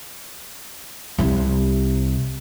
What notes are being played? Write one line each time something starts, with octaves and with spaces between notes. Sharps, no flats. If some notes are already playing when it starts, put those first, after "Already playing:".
C2 C3